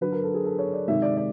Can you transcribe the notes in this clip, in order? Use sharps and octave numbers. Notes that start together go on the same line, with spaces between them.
D3 F#3 B4
A#4
A4
G#4
A4
C#5
D5
C3 D#3 G#3 E5
D5
D5